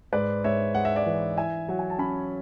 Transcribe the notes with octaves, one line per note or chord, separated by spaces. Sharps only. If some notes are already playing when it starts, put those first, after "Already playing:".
G#2 B4 D5
G#2 C#5 E5
G#3 F#5
E5
D5 F#5
E3
E4 E5 G#5
F#3 F#5
G#5
A5
C#4 G#5 B5